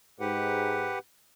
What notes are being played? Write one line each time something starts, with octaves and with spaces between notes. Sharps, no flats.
G#2 G4 B4 F#5